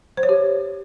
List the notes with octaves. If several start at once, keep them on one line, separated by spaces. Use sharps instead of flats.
C5
C#5
G4